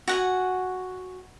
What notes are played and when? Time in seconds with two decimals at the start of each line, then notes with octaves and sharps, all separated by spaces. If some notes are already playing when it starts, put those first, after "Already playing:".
0.08 F#4 F#5 G#5